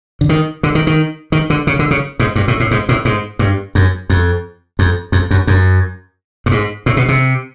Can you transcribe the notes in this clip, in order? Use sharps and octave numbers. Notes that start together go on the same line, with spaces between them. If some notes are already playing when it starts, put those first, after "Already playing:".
D3
D#3
D3
D#3
D#3
D#3
D3
C#3
D3
C#3
G#2
G2
A2
A2
G#2
A2
G#2
G2
F#2
F2
F2
F2
F#2
F#2
G2
G#2
A2
B2
C3